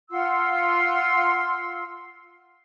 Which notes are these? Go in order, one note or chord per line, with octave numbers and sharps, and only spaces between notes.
F4 F#5 C6 E6